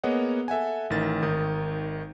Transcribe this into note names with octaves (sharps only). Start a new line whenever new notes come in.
A#3 B3 G#4 C#5 D#5 F#5
A4 E5 F#5 G#5
A1 D#3 A6
G#1 D#3 D#4 D#6